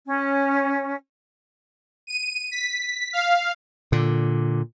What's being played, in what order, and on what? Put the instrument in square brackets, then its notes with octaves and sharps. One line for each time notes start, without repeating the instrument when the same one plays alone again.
[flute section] C#4
[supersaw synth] D#7
B6
F5
[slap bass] A#2 D3